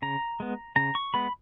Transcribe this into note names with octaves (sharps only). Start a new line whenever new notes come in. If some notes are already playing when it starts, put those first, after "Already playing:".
C#3 A#5
G#3 B3
C#3 A#5
C#6
G#3 B3 B5